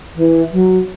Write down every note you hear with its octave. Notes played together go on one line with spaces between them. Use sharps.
E3
F#3